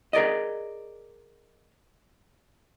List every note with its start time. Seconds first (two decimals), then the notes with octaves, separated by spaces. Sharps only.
0.13 G#4 A#4 D5 D#5